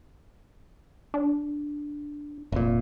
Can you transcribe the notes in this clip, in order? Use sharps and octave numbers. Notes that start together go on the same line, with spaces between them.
D4
F1 A#2